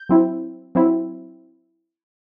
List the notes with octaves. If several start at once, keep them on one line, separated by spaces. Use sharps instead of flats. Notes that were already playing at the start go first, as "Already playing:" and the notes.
Already playing: G6
F#3 C4 E4
F#3 C4 E4